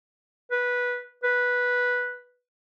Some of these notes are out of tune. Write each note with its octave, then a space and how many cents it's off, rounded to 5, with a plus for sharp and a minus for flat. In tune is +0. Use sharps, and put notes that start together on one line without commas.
B4 -10
B4 -5